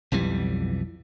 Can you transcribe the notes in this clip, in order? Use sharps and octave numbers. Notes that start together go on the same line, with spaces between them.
B1 F2 E3 G3